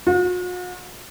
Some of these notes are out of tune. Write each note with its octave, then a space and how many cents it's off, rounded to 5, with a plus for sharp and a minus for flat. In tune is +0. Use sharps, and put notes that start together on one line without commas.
F#4 -45